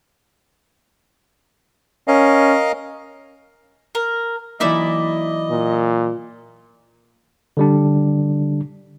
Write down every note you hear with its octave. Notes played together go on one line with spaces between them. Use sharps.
C#4 A#4 D#5 F5
A#4
E3 F#3 A#3 D#4 E4 D5 D#5
A#2
D3 G3 D4